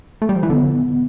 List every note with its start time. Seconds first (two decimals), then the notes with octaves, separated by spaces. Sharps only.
0.22 A3
0.29 G3
0.36 F3
0.43 E3
0.50 D3 B3